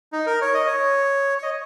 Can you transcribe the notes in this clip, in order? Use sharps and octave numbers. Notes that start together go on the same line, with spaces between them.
D#4
A#4
C#5
D#5
C#5
C#5
D#5